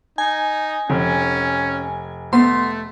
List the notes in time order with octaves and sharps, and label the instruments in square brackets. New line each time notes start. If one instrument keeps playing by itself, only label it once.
[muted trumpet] D#4 [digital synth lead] G#5
[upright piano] F1 [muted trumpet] C#4
[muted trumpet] A3 [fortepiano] B3 [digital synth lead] C6